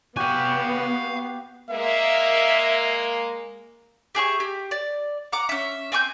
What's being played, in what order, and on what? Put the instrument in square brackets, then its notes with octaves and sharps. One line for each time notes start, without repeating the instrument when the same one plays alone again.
[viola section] B3 [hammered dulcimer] F#4 G4 [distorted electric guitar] F5 G#5
[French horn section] G#3 A#3 [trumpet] E5
[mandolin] G4 G#4 E5 C#6
G4
D5
F#5 A#5 D6
C#4 E5
C4 G#5 C#6 G6